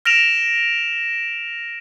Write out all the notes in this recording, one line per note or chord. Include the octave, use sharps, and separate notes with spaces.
F6 A#6 D7 E7 F7